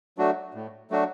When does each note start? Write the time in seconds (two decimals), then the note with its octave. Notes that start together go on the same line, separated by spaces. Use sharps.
0.18 F#3 A3 D4 F#4
0.54 A2
0.91 F#3 A3 D4 F#4